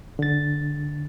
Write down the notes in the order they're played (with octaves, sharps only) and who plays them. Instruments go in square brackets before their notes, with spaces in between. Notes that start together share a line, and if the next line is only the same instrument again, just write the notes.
[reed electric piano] D3 A6